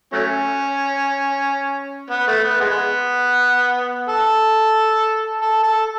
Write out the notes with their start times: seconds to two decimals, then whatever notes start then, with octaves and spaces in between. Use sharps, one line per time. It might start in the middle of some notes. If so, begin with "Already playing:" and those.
0.13 F#3 A3 C#4
2.10 B3
2.27 A3
2.44 B3
2.60 G#3 B3
4.09 A4
5.41 A4
5.63 A4